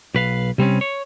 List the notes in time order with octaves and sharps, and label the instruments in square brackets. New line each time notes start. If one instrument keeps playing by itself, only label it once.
[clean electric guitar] B1 B4 F5
C3 G3 C4 C#4
C#5